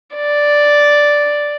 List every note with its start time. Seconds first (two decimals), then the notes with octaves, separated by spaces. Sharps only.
0.15 D5